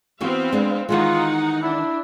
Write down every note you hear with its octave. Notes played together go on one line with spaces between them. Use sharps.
E3 B3 C4 F#4 F5
G#3 D4
D#3 E3 G#3 D#4 F4 F#5
D4 E4